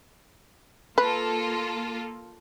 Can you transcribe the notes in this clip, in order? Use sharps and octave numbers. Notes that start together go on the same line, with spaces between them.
A#3 F4 A4 B4